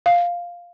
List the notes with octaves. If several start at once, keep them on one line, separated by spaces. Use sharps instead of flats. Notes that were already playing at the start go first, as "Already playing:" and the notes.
F5